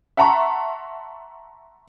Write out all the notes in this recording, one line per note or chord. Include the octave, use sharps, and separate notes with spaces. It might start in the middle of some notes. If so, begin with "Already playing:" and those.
E5 F#5 A5 A#5 C6 C#6